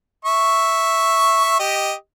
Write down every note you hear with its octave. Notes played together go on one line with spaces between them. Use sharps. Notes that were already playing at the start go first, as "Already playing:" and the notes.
E5 C#6
G4 D#5